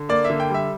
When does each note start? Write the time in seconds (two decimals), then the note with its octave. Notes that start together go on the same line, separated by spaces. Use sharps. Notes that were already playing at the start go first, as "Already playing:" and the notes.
Already playing: D3
0.09 A#3 D5
0.25 E5
0.30 D3
0.40 G5
0.50 G3 E5